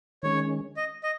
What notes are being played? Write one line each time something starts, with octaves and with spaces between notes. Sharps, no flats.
D#3 G#3 C#4 C#5
D#5
D#5